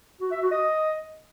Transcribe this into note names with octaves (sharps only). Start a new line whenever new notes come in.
F#4
E5
F#4
D#5